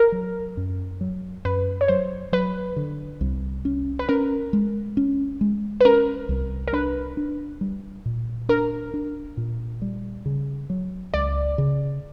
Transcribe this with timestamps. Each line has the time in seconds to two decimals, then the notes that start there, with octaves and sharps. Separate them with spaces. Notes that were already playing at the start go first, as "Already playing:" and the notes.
Already playing: A#4
0.12 F#3
0.57 F#2
1.01 F#3
1.45 F#2 B4
1.81 C#5
1.88 F#3 C5
2.32 F#3 B4
2.76 D3
3.21 C2
3.65 C#4
3.99 B4
4.09 C#4 A#4
4.53 G#3
4.97 C#4
5.41 G#3
5.81 B4
5.85 C#4 A#4
6.29 C2
6.68 A#4
6.73 D4 B4
7.17 D4
7.61 G3
8.06 A#2
8.49 D4 A#4
8.94 D4
9.37 A#2
9.82 G3
10.26 C#3
10.70 F#3
11.14 C#2 D5
11.58 C#3